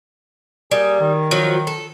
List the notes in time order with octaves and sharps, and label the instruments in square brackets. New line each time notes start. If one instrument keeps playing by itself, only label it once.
[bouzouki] G3 [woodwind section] A#3 G#4 G#5
[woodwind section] D#3
[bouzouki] F3 F#3
A4